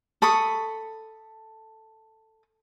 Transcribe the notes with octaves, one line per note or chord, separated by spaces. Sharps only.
A4 B5 C#6 D#6